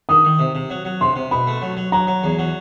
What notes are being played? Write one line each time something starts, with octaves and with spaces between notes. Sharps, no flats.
D#3 D#6
D#3
C3
C3
F#3
F#3
C3 C6
C3
B2 B5
A3
F#3
F#3
F#3 A#5
F#3
E2
F#3